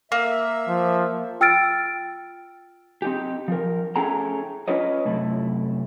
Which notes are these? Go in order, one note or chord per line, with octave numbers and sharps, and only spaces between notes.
A#3 E5
F3
F4 G5 E6 F6 A6 D7
C4 D#4 G4
F3 A#4
A3 C#4 E4 G#4 G5 A#5
C#4 F4 B4 C#5 D#5
F#2 C3 A3 E4